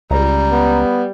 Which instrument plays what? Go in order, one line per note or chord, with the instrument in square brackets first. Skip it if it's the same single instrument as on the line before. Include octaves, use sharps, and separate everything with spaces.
[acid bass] C#2 [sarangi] G3 [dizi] A#5
[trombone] B3